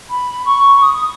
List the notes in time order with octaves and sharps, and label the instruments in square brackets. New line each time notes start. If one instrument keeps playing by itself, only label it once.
[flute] B5
C#6
D#6
D#6